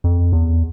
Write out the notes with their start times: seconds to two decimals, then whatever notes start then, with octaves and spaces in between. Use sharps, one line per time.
0.04 F2
0.33 E2